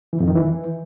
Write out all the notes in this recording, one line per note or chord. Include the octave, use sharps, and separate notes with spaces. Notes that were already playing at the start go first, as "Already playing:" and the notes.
E3
F2
D#3
E3